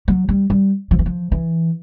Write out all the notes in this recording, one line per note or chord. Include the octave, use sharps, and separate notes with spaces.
F#3
G3
G3
F3
E3
F3
E3